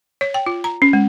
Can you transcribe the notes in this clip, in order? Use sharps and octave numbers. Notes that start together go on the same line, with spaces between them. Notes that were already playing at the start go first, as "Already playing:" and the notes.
C#5
G5
F4
A#5
C#4
G#3